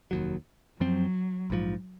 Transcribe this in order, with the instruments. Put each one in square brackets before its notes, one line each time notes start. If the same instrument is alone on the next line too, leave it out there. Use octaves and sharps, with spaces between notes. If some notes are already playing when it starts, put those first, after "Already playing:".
[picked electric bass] F1 D#2 C#3 F#3
[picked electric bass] F#2 F3 C4 [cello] F#3
[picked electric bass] A#1 G#2 F3